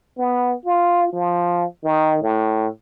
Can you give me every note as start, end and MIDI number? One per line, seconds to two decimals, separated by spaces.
0.18 0.55 59
0.65 1.12 65
1.13 1.65 53
1.84 2.19 51
2.22 2.67 45